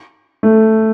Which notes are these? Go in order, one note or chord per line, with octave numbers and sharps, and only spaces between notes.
A3